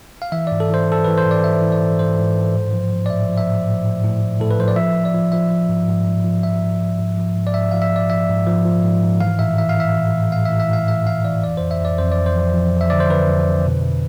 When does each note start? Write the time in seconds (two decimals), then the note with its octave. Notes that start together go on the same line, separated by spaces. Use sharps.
0.22 F5
0.32 E3 E5
0.47 G#2 D5
0.60 A4
0.70 E3 C5
0.88 E3 A4
1.04 E3 B4
1.18 C5
1.25 G#2
1.31 D5
1.44 E3 E5
1.62 E3
1.72 D5
1.81 G#2
1.99 G#2 C5
2.18 G#2
2.36 G#2
2.54 A2
2.73 F3
2.92 F3
3.06 D5
3.10 A2 E5
3.29 F3
3.37 E5
3.47 A2
3.66 A2
3.84 A2
4.03 A2
4.21 A2
4.40 A2 A4
4.51 B4
4.59 F3 C5
4.68 D5
4.76 F3 E5
4.95 F3
5.05 D5
5.14 F3
5.32 F3 E5
5.51 F3
5.69 G#2
5.88 G#2
6.06 G#2
6.24 F3
6.43 F3 E5
6.62 G#2
6.80 F3
6.99 G#2
7.18 F3
7.36 G#2
7.47 D5
7.54 G#2 E5
7.71 F3 F5
7.82 E5
7.92 G#2 D5
8.10 F3 E5
8.29 G#2
8.47 F3
8.65 F3
8.84 G#2
9.03 G#2
9.21 E3 F5
9.39 A2 E5
9.58 E3 E5
9.69 F5
9.77 E3 E5
9.96 A2
10.14 A2
10.32 A2 F5
10.45 E3 E5
10.60 E5
10.69 A2 F5
10.87 A2 E5
11.06 A2 F5
11.25 E3 D5
11.43 F2 D5
11.57 F2 C5
11.71 E5
11.80 F2 D5
11.98 F2 C5
12.12 D5
12.18 F2
12.26 C5
12.36 F3
12.54 F3
12.73 F2
12.81 E5
12.90 D3 D5
13.00 C5
13.10 D3 B4
13.29 F2
13.46 D3
13.66 B2